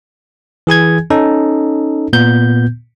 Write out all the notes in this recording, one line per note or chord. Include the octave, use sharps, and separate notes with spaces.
E3 G#4 G#5 G#6
C#4 D#4 A4
A#2 B3 G6